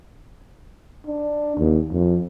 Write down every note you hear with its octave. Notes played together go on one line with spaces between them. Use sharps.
D4
D#2
F2